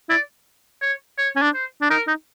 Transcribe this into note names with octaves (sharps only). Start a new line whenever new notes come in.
E4 D5
C#5
C#5
C#4
D4
C5
D4
D#4 A#4
D#4